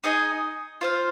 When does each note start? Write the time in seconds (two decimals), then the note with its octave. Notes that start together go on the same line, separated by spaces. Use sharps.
0.04 D#4 G#4 D#5 G#5
0.81 F4 C5 F5